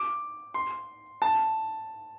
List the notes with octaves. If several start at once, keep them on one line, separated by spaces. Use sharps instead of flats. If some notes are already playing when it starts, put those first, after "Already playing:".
Already playing: D6
C6
A5